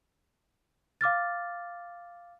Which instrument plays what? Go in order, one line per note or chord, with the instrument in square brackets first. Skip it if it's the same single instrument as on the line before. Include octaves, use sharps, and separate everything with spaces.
[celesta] F5 D6 F6 A6